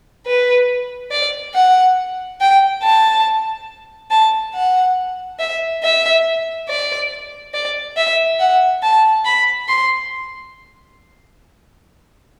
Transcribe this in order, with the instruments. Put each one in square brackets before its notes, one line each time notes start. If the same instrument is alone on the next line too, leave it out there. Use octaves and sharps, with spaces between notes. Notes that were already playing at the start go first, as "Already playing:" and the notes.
[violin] B4
D5
F#5
G5
A5
A5
F#5
E5
E5
D5
D5
E5
F#5
A5
B5
C6